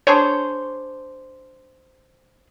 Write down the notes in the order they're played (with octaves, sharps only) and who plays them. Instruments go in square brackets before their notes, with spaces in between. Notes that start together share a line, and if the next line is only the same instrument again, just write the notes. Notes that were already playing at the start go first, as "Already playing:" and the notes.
[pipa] D4 G#4 C5 [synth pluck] C#5